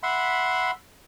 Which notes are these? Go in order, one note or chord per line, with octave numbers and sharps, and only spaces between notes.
E5 F#5 B5 C6